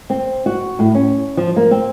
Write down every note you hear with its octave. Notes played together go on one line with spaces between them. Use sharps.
C4
F#4
A2
C#4
F3
A#3
C4